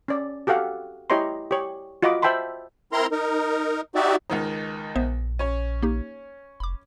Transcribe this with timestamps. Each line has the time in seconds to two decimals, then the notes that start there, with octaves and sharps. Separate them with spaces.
0.08 C#4 D5
0.47 F#4 G4 A4 F5 F#5
1.10 E4 G4 C#5 D#5 A#5 C6
1.51 G4 C#5
2.02 F4 F#4 D#5 F#5 B5 D6
2.22 C5 E5 G5 A5 B5 C6
2.93 C4 E4 A#4 A#5 C6
3.12 D#4 A#4
3.95 D#4 F#4 G4 D5 E5
4.30 C#2 D#3 D#4 C5 F#5
4.96 A#1 B3 C5 E5
5.39 C#4 C#5
5.83 A#3 D#4 G4
6.60 F1 B5 D6